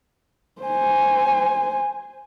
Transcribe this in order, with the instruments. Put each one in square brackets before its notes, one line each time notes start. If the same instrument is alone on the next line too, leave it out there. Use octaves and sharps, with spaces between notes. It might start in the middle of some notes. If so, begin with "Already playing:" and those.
[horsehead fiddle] C5 G#5